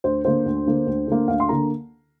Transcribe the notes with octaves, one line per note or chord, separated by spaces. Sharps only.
D2 C5
D3 A#3 C5
D2
D3 A#3
D2
D3 A#3
D2 F5
C6
D3 A#3 A#5